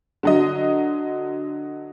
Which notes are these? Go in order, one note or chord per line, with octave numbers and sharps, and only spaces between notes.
D3 F#3 D#5